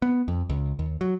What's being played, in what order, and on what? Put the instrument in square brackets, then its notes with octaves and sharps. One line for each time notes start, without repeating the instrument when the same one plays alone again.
[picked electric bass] B3
F2
C#2
D#2
F#3